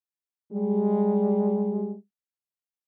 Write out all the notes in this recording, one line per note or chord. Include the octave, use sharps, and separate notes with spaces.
G3 G#3